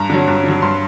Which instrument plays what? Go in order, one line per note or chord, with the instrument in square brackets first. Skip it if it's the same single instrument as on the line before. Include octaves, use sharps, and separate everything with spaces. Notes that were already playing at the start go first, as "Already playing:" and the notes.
Already playing: [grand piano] G2 A#5
D3 F#3
G2
D3 F#3
G2 C6